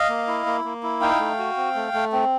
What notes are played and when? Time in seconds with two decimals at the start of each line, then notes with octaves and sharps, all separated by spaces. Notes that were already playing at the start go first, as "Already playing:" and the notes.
Already playing: D#5 F5
0.09 A#3
0.27 E4
0.46 A#3
0.64 A#3
0.83 E4
1.01 D#4 F5 G5
1.20 A3
1.39 F#4
1.57 C4
1.75 A3
1.94 A3
2.13 C4